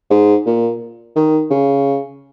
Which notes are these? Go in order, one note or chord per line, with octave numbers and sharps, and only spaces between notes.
G#2
A#2
D#3
C#3